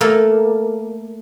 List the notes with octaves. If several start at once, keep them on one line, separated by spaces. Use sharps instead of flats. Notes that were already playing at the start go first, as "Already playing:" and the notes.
A3 A#3 A4